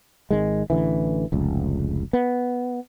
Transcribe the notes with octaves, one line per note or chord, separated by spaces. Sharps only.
G#1 D#3 G#3
A1 D3 E3
F1 C#2
B3